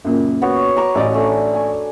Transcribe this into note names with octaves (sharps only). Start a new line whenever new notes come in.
F#2 A#2 C#3
B3 F#4 C#5
A#5 C#6 D6
A1 C#4 D5 D#5
A3 D4
G#5